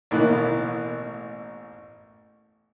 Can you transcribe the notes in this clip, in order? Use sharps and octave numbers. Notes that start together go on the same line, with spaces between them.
A1 B2 A#3 E4 F#6